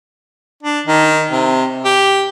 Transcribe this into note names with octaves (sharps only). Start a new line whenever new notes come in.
D4
D#3
C3
G4